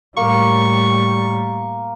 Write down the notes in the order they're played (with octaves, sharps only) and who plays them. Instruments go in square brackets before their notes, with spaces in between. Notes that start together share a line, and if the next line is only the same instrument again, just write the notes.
[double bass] A2 G3 [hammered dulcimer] A#3 [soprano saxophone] C#6